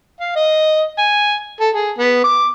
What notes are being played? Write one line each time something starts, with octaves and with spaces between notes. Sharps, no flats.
F5
D#5
G#5
A4
G#4
B3
D6